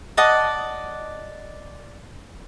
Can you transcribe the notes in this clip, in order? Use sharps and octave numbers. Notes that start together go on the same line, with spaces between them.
D5 D#5 F#5 A5